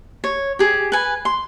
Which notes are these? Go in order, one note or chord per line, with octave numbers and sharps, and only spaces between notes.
C#5
G4 G#4
B4 G#5
C6